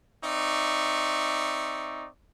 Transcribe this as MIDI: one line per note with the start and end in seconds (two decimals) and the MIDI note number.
0.24 2.07 60
0.24 2.07 63
0.24 2.07 74
0.24 2.07 76
0.24 2.07 85